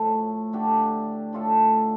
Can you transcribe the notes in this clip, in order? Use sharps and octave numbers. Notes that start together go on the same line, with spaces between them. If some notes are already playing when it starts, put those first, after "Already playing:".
Already playing: A2 F3 A3
D3 A3 D4 G4
A2 A3 F4 A4